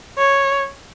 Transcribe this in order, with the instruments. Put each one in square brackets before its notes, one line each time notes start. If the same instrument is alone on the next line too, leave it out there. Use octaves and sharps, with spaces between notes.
[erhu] C#5